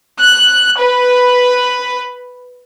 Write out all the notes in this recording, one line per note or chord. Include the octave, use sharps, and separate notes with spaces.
F#6
B4